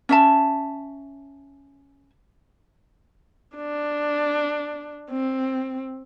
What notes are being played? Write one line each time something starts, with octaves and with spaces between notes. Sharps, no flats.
C#4 E5 A5
D4
C4